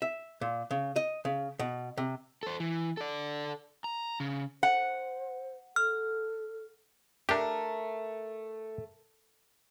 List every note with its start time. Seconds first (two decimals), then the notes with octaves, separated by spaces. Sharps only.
0.02 E5
0.41 A#2
0.71 C#3
0.96 D#5
1.25 C#3
1.59 B2
1.98 C3
2.43 A4 C5
2.60 E3
2.97 A4 D5
3.84 A#5
4.20 C#3
4.63 C5 F#5
5.76 A4 F6
7.29 A3 D4 G4 A#4